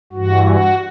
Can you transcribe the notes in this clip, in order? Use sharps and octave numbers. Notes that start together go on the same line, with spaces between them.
G2 E3 F#4
F#4